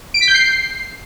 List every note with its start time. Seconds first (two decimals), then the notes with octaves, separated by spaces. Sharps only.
0.14 D7
0.21 B6
0.28 G6
0.34 C7